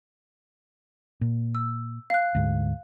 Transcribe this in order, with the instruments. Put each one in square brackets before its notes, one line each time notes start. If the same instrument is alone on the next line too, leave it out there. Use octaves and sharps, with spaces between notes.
[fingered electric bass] A#2
[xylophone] E6
F5 F#6
[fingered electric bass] D2 G#2